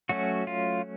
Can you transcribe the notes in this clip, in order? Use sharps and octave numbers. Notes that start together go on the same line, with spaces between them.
F#3 A3 C#4 F#4
F4